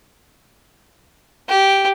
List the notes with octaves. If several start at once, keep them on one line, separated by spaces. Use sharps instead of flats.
G4